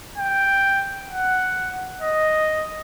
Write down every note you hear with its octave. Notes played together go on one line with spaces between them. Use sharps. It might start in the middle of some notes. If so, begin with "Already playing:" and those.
G5
F#5
D#5